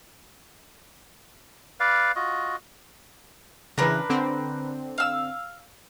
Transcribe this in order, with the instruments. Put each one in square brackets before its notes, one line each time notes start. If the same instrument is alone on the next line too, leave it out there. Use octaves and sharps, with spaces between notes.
[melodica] B4 D5 F5
F4 F#4 D#5
[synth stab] C#3 E3 [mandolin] D4 A#4 B4
[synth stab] D3 C4
[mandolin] F5 E6